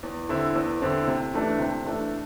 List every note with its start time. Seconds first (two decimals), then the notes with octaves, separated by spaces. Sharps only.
0.03 E2
0.29 D3 C4 E4
0.56 E2
0.82 D3 C4 E4
1.08 C3
1.34 E3 A3 D4
1.59 C3
1.85 E3 A3 D4